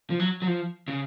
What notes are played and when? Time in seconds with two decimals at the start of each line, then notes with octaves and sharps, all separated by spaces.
0.10 F3
0.20 F#3
0.42 F#3
0.47 F3
0.88 C#3